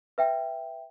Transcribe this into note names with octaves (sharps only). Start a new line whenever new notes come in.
B4 E5 G5